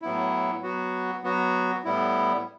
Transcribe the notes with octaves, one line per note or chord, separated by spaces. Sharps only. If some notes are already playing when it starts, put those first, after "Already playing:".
A2 F#3 B3 E4
F#3 B3 F#4
F#3 B3 F#4
A2 G3 B3 E4